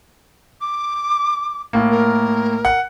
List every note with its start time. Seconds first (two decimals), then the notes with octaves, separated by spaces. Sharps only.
0.61 D6
1.73 A2 A#3
1.90 A#4
2.65 F#5